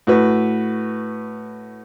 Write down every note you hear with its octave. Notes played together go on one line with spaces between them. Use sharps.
A2 F#4 B4